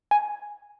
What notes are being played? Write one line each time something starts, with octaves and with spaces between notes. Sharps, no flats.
G#5